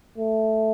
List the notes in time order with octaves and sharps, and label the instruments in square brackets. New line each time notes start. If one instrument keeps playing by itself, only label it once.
[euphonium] A3